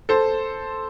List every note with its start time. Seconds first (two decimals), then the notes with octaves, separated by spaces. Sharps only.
0.09 A4 C5